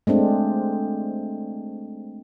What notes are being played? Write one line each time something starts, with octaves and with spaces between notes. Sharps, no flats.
G#3 A3 C4 D4